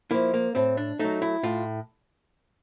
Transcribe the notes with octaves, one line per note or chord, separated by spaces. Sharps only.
F3 A#3 E4
A#3
A2 C4
D4
F#3 A3 D#4
E4
A2 F4